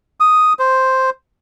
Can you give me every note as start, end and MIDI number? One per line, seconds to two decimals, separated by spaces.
0.20 0.53 87
0.59 1.10 72